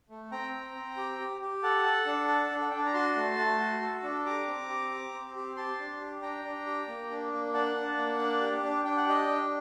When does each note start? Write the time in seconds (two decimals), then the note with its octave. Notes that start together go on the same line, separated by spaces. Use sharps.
0.10 A3
0.32 C4 G5 A#5
0.53 C4
0.75 C4
0.97 G4
1.19 G4
1.41 G4
1.63 A4 F#5 A5
1.85 A4
2.06 D4
2.28 A4
2.51 D4
2.61 F#5
2.70 D4 G5
2.79 A5
2.86 A#5
2.94 F#4 A5 C6
3.16 A3
3.38 A3
3.59 F#4
3.82 A4
4.03 D4
4.26 G4 A#5 D6
4.48 C4
4.69 G4
4.92 G4
5.14 C4
5.35 G4
5.56 G4 A5 C6
5.79 D4
6.01 G4
6.22 D4 G5 A#5
6.45 D4
6.66 G4
6.88 A#3
7.10 D4
7.32 A#3
7.54 D4 F#5 A5
7.75 D4
7.97 A#3
8.19 D4
8.41 G4
8.63 D4
8.84 D4 G5
8.97 F#5
9.07 G4 D#5 G5
9.29 D4